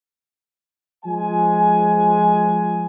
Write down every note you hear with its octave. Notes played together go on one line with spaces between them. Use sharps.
F3 G#3 G#5